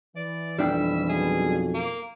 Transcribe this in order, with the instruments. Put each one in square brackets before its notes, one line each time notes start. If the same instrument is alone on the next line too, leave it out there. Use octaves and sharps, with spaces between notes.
[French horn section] E3 [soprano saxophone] D5
[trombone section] B1 F2 [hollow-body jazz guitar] G3 D4 G5 [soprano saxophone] E5
[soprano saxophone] G#4
A#3